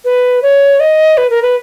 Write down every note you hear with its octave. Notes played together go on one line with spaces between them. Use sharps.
B4
C#5
D#5
B4
A#4
B4